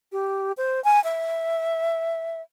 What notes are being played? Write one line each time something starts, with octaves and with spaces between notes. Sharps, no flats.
G4
C5
G#5
E5